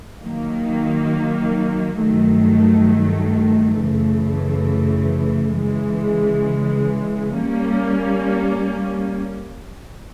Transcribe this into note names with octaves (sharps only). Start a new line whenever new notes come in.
D#3 F#3 A#3
G2 D#3 F#3 A3
F#2 C#3 E3 A3
C#3 E3 G#3
G3 A#3 C#4